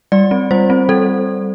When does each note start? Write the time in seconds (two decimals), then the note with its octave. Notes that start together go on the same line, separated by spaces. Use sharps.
0.12 G3 D5
0.31 C4
0.51 G3 C5
0.70 C4
0.89 G3 A4